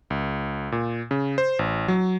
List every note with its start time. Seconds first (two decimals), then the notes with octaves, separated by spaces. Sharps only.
0.10 C#2
0.72 A#2
1.11 C#3
1.38 C5
1.59 A1
1.88 F#3